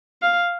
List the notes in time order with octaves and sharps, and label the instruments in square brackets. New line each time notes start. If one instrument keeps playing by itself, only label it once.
[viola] F5